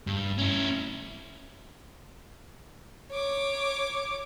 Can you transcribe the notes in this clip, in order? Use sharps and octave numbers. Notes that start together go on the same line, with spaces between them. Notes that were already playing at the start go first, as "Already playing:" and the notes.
G2
C#4 E4
C#5 D6